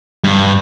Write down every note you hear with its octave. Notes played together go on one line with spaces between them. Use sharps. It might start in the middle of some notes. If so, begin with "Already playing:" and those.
G2